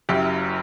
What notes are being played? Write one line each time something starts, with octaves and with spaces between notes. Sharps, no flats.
F#1 F#2 F#3 E4 G4